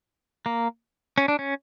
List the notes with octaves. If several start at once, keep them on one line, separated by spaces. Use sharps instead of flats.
A#3
C#4
D4
C#4